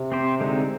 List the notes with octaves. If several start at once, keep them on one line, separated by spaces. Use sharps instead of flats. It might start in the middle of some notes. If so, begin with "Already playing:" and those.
Already playing: C3
C4 G4 C5
D3 G#3 C4 D#4